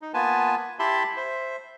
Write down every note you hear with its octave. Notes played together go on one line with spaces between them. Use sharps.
D#4
A#3 B3 F4 B4 G#5 A5
E4 G4 E5 A5 B5 C6
C5 E5